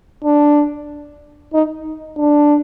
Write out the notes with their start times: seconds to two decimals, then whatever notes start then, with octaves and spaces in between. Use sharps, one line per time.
0.24 D4
1.53 D#4
2.18 D4